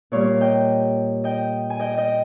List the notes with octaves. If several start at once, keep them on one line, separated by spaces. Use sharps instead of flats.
A#2 G3 A#3 C#5 F5
D#5 G5
D#5 G5
G#5
D#5 G5
D#5 G5